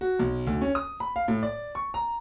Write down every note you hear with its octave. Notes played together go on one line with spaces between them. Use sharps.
F#4
B1
D2
C#4
D#6
B5
F5
A2
D5
C#6
A#5